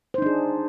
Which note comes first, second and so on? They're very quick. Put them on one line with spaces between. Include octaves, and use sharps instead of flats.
C5 D#4 D4 G#4